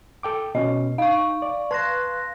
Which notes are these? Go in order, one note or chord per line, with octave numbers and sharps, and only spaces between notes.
A4 G5 D6
B2 C#4 D#5
D#4 F5 C#6
D5
B4 A5 C6 F#6 A#6